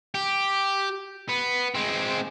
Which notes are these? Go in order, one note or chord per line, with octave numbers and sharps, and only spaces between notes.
G4
B3
G#3 C4